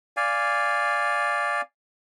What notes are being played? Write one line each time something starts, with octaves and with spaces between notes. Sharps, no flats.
D5 F5 G#5